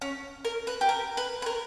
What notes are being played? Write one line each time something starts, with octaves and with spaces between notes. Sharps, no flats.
C#4
A#4
B4
G4
A#4
B4
B4
A#4